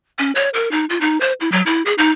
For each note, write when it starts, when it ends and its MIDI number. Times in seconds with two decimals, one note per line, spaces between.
0.19 0.32 61
0.35 0.49 73
0.54 0.71 70
0.71 0.85 63
0.89 1.00 65
1.01 1.20 63
1.20 1.33 72
1.40 1.51 64
1.52 1.62 54
1.66 1.82 64
1.85 1.94 68
1.98 2.11 63